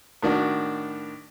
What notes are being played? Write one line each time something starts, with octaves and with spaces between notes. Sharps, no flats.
A2 D#3 D4 F#4